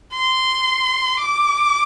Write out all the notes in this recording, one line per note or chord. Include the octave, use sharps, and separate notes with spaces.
C6
D6